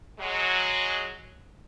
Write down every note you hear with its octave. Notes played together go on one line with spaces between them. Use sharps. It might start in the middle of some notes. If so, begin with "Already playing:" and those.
F#3 G#3